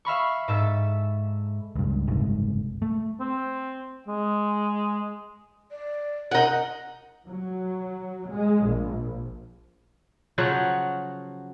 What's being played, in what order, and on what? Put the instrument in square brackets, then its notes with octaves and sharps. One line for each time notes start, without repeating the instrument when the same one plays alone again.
[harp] E5 F5 B5 C#6
G#2 A4 E5
[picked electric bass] C#2 G2
F#1 C2 G#2
A3
[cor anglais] C4
G#3
[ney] D5
[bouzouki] D#4 F#5 [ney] A#4
[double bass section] F#3
G#3
A#1
[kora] C#3 F3 F#3 F#4